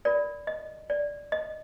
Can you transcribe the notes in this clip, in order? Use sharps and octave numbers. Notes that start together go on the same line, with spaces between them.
F4 A#4 D5
D#5
D5
D#5